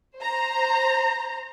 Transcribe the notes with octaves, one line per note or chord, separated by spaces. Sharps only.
C5 A#5